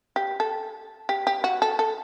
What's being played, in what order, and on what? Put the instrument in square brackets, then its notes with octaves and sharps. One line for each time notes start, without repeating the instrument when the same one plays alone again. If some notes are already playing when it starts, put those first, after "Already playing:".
[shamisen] G4
A4
G4
G4
F#4
A4
A4